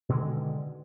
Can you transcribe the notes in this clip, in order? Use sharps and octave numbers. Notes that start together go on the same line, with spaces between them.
B2 D3 D#3 G#3